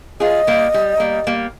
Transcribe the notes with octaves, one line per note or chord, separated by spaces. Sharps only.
F4 G#4 D#5
G3 A#3
G3
G3 A#3
G3 A#3